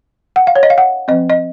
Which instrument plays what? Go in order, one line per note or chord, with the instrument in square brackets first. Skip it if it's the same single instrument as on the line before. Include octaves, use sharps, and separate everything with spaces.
[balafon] F#5
F5
C#5
D#5
F5
F#5
F3 C4 D#5
D#5